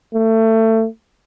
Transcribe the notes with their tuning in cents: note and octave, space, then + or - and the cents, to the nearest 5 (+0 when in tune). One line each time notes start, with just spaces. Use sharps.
A3 +25